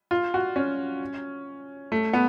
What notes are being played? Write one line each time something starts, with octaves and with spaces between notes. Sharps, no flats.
F4
F#4
C#4
A3
B3